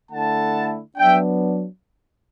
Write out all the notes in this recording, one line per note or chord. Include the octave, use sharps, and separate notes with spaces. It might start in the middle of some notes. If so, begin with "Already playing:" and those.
D3 A3 E4 F#5 A5
F#3 B3 D4 E5 G5